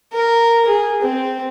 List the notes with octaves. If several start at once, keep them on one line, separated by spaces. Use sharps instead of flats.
A#4
G#4
C4